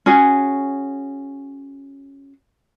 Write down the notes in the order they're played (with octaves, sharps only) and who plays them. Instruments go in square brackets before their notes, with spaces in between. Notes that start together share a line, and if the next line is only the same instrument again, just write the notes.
[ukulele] C#4 F#4 G#4